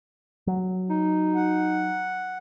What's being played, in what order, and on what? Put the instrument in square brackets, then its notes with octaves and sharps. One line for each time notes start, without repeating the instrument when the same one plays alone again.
[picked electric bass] F#3
[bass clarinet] D#4
[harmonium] F#5